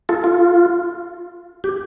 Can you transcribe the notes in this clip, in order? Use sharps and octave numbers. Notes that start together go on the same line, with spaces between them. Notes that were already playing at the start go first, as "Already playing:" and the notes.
F4 A4
F4
G4